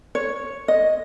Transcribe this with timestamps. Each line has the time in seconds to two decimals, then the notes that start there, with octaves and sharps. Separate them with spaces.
0.15 C#5
0.68 D#5